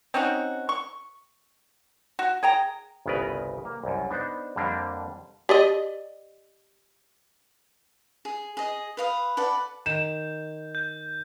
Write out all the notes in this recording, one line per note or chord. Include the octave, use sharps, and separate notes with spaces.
C4 C#4 D#4 F#4
C#6
F#4
G#4 G5 A#5
G1 C2 C#3 B3 A#4 B4
A#3
C2 F#2
B3 D4 D#4 C5
F2 D3 G3 A#3 D4
G4 D5 D#5
G#4
G#4 D#5
B4 F5 D#6
A4 B4 D5 F#5
D#3 G6 E7
G6